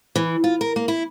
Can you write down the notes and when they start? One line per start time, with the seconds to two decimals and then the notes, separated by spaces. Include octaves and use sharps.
0.16 E3
0.44 F4
0.61 A#4
0.76 A#3
0.88 E4